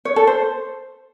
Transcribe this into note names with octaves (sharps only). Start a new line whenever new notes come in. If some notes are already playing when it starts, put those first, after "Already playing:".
C#5
A4
C5